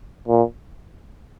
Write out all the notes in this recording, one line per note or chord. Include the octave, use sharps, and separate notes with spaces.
A#2